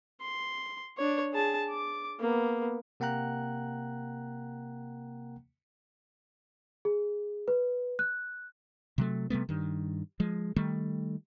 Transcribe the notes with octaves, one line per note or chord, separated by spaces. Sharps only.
C6
D4 C#5
G#4 A5
D6
A#3 B3
C3 A#3 F#5 G5 A#5 F#6
G#4
B4
F#6
C3 F#3 A3
C3 G3 A3 B3
G2 D#3
F3 G#3
D#3 G3 A3